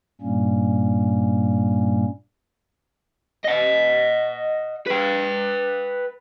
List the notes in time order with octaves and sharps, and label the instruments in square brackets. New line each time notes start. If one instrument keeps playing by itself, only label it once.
[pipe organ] G2 A#2 G3 A#3 C#4
[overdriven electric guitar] D#5 F#5
B4 G5